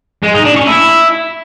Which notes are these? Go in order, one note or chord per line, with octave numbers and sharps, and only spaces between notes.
G#3
D#4
D4
C#4
E4